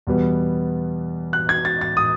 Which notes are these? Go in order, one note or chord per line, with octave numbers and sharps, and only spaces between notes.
E2 B2 G3 B3
F#6
G#6
A6
A6
D#6